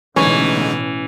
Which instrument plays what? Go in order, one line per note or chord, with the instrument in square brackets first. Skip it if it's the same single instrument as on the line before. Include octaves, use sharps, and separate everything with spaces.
[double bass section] A1 B2 [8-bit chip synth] D3 G#3 D#4 [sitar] E3 [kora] C#4